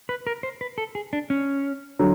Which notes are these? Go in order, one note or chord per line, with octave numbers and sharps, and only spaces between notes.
B4
A#4
C5
B4
A4
G#4
D4
C#4
D3 F#3